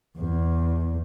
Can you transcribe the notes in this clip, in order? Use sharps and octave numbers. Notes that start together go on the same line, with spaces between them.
E2